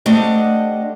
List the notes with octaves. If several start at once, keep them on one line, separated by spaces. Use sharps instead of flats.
A3 C4 D4 G4 D#5 F#5